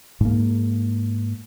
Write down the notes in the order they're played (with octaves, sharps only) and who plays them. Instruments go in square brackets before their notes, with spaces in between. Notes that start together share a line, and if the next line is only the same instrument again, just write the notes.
[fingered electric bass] G#2 A#3